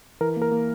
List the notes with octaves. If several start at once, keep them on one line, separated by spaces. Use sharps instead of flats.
E3 A#4
A#3
A#4
A#3